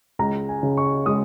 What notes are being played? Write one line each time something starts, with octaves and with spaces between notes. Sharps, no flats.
C#2 A#5
G#5
C#3
C#6
G#3 D#6